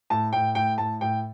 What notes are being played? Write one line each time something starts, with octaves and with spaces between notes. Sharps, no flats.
A2 A5
A2 G5
A2 G5
A2 A5
A2 G5